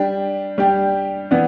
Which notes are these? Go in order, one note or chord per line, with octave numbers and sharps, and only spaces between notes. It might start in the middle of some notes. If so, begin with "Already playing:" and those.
Already playing: G3 D4 G4
G3 D4 G4
E3 B3 D4